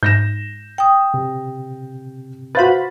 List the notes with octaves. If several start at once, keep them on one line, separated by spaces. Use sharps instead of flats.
G#2 G6 A#6 E7
G5 D#6
C3
F#4 B4 C5 F5 B5 A6